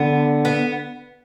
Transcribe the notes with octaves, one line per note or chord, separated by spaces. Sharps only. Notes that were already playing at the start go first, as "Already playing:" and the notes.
Already playing: D3 B3
B3